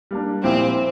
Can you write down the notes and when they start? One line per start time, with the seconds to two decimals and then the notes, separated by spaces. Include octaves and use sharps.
0.11 G3 A#3 D4
0.43 A#2 F3 A#3 C4 E4 G4